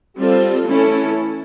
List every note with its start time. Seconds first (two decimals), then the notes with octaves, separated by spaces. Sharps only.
0.17 G3 C4 F4 A4
0.66 E3 A3 C#4 E4 A4